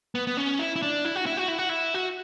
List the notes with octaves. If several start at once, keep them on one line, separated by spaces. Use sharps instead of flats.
B3
B3
C#4
E4
E4
D4
E4
F#4
E4
F#4
E4
F#4
E4
F#4